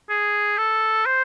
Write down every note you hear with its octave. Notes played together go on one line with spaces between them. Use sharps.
G#4
A4
C5